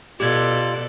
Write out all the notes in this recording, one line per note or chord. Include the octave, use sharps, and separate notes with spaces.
B2 F4 G4 A4 D5 F#6 G#6